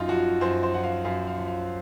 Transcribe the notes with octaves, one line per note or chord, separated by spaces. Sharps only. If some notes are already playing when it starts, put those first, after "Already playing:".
Already playing: F#2 D#4 F4
F3 F#4
F#2 C5
C5
F3 F#5
F5
F#2 F5
F5
F3
F5